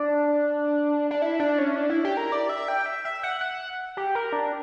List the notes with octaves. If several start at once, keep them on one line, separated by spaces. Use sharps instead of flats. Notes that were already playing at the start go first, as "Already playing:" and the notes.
Already playing: D4
D4
E4
D4
C#4
D4
E4
G4
A#4
D5
E5
G5
E5
E5
F#5
F#5
G4
A#4
D4